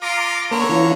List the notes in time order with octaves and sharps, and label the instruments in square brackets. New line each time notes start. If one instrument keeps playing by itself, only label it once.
[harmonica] F4 [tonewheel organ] A#5 D6
[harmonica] D3 C#5 A#5 [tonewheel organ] A#3
[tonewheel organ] E3 C#4 F4